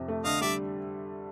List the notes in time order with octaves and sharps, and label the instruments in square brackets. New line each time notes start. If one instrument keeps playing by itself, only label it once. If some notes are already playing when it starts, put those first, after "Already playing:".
Already playing: [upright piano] F2 C3
A3
[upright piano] D3 [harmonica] D#5 F5
[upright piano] G3 [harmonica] D5 E5